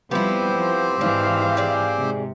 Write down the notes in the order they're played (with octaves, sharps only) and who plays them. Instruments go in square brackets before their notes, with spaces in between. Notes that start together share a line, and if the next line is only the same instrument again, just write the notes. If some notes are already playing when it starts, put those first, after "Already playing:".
[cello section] F3 G3 [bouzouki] B3 E4 [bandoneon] C4 G4 C5
[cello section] F3
[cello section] G#2 E3 F5 [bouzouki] D4
[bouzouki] G#4 D5
[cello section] G#2 C3